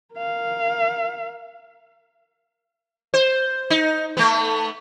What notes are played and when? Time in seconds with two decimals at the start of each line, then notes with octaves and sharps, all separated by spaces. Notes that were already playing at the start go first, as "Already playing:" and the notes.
0.14 A#4 F5
3.14 C5
3.70 D#4
4.17 A3 B3